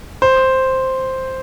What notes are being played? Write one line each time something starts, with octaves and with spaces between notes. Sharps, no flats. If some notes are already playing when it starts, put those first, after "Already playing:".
C5